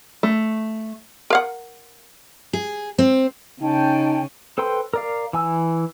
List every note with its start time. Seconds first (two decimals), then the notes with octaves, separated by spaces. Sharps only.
0.23 A3
1.30 A#4 F5 F#5
2.53 G#4
2.98 C4
3.62 C#3 C#4 D#4 G5 A5
4.58 A4 B4 C5 G5 C6
4.94 A#4 D5 F5
5.33 E3 G#5 E6